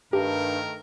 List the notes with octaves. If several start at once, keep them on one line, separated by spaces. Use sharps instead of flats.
G2 D#3 A3 G4 A#4